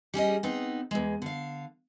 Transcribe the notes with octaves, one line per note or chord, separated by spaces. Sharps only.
G3 C#4 G#4 D#5
B3 C4 D#4
E2 G#3
D3 F5